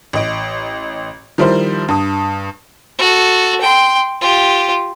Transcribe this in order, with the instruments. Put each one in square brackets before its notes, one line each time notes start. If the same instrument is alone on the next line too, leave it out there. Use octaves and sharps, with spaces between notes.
[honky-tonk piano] A1 D#5 D7
D#3 F3 G3 E4 A#4 C5
G2 D#6
[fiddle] F#4 A4
G5 C6
F4 G4